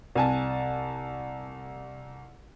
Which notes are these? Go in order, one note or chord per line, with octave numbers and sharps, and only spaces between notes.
C2 G#5 A5